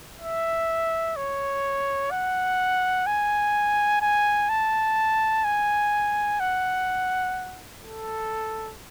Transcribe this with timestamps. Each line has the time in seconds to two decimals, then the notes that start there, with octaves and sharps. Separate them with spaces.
0.21 E5
1.16 C#5
2.11 F#5
3.06 G#5
4.01 G#5
4.49 A5
5.44 G#5
6.40 F#5
7.82 A4